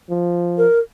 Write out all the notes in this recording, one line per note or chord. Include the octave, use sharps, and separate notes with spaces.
F3
A#4